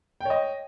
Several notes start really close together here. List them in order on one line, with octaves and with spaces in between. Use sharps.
G5 C#5 D#5